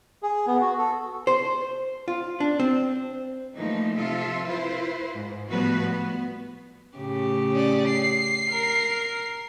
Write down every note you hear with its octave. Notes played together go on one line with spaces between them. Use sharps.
G#4
B3
F#4
A4
C5
F4
D4
C4
E3 F3 G3 A3 A#3 D#4
C3 F3 F4 A4 E5
E4 F4 B4 C5
G#2
A2 F3 G3 B3 F#4 B4
B3
A2 C#3 G4
C#4 D5
C7
A#4